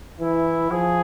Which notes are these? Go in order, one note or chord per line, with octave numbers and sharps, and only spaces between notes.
E3 E4
F3 G#4